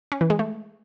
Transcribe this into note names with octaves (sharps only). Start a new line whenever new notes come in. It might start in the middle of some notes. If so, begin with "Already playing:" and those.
C#4
E3
G#3
A3